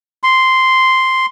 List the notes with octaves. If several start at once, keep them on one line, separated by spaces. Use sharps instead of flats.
C6